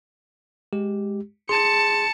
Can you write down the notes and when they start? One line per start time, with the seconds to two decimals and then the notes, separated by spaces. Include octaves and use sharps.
0.73 G#3 G4
1.49 G#4 A5 C6 C#7